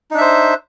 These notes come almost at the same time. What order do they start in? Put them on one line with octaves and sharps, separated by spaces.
D#4 D4 E5 C5